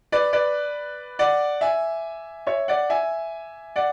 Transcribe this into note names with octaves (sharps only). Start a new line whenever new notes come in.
B4 D5
B4 D5
D5 F#5
E5 G#5
C#5 E5
D5 F#5
E5 G#5
D5 F#5